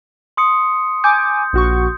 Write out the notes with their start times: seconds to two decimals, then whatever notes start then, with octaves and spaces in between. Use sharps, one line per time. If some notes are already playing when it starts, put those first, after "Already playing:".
0.37 C6 D#6 C#7
1.04 G#5 D6 G6
1.53 A#1 F#4 C#6